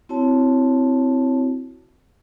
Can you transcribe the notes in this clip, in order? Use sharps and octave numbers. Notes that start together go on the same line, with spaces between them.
C4 E4 F#4 C#5 A5